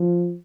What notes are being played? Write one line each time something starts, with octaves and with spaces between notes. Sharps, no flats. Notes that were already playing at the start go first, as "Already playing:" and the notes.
Already playing: F3